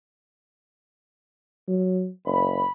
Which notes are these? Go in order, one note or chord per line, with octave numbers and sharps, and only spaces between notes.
F#3
F#1 B5